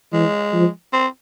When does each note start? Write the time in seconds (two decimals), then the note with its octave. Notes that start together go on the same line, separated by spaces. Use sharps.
0.13 E3 G#3
0.54 F3
0.93 C4